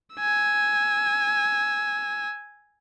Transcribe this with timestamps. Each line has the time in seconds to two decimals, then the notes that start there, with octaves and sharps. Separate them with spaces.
0.16 G#5 E6